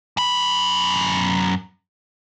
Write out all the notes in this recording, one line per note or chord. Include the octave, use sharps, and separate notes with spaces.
F#2 B5